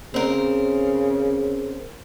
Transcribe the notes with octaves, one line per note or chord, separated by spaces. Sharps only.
C#3 C4 A#4